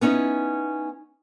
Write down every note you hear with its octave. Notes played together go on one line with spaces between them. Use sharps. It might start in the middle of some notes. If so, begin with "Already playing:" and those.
B3 C#4 D#4 E4